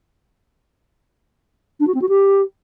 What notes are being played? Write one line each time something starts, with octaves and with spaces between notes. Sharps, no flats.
D4
F#4
C4
F#4
G4